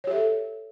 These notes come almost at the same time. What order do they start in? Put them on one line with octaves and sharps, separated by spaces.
C#5 G4 E5 A4